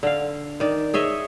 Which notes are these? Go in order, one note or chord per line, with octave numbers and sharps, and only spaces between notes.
D3 F5
D#3 D5
G#4 C#5 D#5 E5